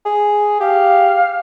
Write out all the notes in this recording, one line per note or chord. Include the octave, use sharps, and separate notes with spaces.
G#4
G4 F5